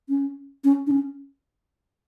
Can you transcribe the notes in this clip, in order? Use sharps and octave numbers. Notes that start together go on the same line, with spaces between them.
C#4
C#4
D4
C#4